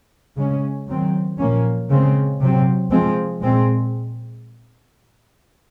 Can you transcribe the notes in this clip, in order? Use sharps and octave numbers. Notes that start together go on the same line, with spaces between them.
C#3 G#3 C#4
D#3 F#3 C4
A#2 F3 A#3 C#4
C#3 G#3 C4
C3 F#3 C4
F3 G#3 C4
A#2 G#3 C4